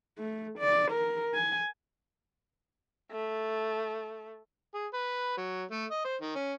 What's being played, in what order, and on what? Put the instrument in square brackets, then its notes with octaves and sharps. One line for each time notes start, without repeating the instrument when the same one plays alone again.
[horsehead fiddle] A3
D5
A#4
G#5
[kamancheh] A3
[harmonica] G#4
B4
F#3
A3
D#5
C5
D#3
C#4